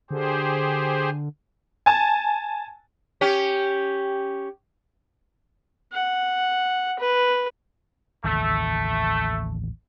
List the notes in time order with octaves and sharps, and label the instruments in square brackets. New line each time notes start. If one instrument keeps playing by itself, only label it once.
[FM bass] D3 [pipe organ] G4 G#4 C5
[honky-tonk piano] G#5 A5
[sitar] C#4 G4
[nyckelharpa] F#5
B4
[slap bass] A1 D#2 C#3 [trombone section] A3